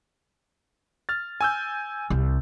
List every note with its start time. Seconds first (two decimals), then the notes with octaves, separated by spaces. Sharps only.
1.09 F6 A6
1.41 G#5 E6 G6
2.10 C2